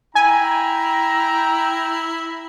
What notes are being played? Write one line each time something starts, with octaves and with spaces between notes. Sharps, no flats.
E4 G5 G#5 A#5